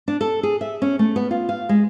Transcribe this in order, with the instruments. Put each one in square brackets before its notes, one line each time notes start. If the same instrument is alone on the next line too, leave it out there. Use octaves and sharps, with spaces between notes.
[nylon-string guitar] D4
A4
G#4
E5
C#4
A3
B3
F4
F5
G#3